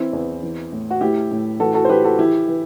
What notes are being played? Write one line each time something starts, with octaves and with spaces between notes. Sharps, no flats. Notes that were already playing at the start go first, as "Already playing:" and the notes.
Already playing: E3 C4 E4
E2
E3
A2
F#4
A2 E4 G4
A2
E3 F#4 A4
F#4 A4
C5
E3 G4 B4
F#4 A4
E3 E4 G4
E3